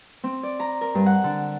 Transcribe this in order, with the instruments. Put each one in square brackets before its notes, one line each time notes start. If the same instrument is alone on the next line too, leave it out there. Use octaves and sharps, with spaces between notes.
[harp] C4
D5
A#5
A#4
G2
F#5
D3